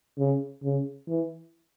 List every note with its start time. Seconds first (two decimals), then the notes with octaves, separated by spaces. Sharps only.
0.19 C#3
0.64 C#3
1.08 E3